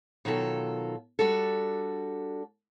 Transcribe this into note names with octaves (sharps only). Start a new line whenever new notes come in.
B2 D#3 F#3 F4 A4
G3 D4 F#4 A4